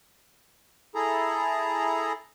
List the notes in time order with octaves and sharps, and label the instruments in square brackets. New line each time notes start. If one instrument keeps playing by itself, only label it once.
[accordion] E4 G#4 A4 A#5